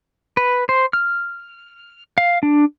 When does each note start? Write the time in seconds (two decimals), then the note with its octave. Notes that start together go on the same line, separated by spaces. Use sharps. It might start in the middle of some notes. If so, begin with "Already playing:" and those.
0.37 B4
0.69 C5
0.93 F6
2.18 F5
2.43 D4